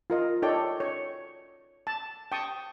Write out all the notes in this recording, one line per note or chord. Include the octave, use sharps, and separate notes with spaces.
F4 A#4 D#5
D#4 A4 C#5 D5 G5
C#5
A5
G5 A5 C#6 D#6